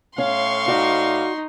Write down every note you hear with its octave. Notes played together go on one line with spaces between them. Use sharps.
A2 C#4 F5 C6 C#6
D#4 F#4 D5